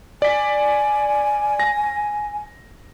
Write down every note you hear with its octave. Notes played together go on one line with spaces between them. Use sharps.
D5 G#5 B6
A#6